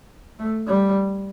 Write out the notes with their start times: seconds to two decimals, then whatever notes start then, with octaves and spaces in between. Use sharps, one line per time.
0.39 A3
0.67 G3